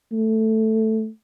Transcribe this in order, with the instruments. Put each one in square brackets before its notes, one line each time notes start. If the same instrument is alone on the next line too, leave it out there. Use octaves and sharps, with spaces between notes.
[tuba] A3